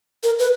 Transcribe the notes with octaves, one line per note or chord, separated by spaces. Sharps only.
A#4
B4